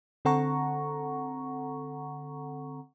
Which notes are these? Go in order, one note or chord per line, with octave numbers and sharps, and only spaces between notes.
D3 C4 A4 F#5 A#5 C#6